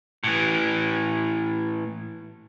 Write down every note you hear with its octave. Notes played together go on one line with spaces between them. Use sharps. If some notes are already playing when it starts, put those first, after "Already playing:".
A2 E3